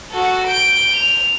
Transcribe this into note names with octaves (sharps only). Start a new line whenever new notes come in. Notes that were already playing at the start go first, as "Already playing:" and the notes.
F#4 A4
G6 D7
F7